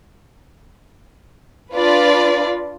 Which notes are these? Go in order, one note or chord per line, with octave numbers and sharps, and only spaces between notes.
D4 F4 B4 D5